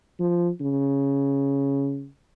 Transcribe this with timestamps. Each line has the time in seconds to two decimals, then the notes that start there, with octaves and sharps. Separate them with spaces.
0.20 F3
0.61 C#3